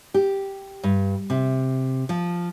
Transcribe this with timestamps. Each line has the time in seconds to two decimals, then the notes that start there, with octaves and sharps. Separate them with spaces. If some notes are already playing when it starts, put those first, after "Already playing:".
0.14 G4
0.83 G2
1.30 C3
2.09 F3